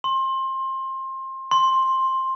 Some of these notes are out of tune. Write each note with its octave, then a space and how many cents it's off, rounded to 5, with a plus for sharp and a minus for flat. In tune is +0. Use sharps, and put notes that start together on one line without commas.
C6 +25
C6 +10